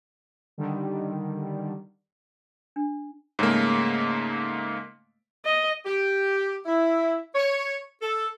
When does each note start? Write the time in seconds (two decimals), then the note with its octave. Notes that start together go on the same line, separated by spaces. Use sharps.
0.58 D3 D#3 G3
2.76 D4
3.39 G#2 C#3 A3 A#3
5.45 D#5
5.85 G4
6.66 E4
7.35 C#5
8.01 A4